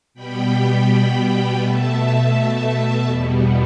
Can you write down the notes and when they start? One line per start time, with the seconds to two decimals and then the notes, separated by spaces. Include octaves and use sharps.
0.14 B2 G3 B3 G5 B5
1.60 B2 A3 E5 A5
3.05 E2 B2 G3 B3